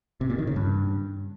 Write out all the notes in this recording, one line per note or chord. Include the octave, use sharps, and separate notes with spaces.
C3
A#2
D#3
C#3
G2